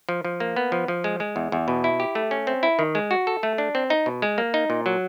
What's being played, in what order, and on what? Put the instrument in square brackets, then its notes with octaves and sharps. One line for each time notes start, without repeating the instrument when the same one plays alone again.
[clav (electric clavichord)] F3
F3
A#3
B3
F3
F3
G#3
G#3
E2
E2
B2
E4
G4
A3
C#4
C4
E4
D#3
G#3
F#4
A4
A3
D4
C4
D#4
B2
G#3
A#3
D#4
A#2
F#3